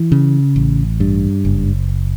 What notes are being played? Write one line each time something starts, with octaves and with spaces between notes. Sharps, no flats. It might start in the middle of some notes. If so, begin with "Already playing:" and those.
Already playing: E3
C#3
A1
G2
F#1